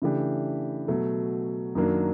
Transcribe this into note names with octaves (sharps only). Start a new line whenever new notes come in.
C#3 E3 A3 D4 G4
B2 F#3 A3
F#2 D#3 F#3 A#3 D4